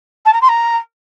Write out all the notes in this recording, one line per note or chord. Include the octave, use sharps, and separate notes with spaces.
A5
A#5
C6
A#5